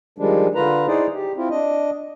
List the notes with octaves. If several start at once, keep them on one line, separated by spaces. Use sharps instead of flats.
D#3 F3 G3 G#3 D4
D3 F4 B4 A#5
D#4 E4 G#4 C5 D5
G4
C4 E4 F4
D4 D#5